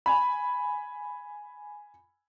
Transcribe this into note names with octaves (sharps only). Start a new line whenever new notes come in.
G#5 B5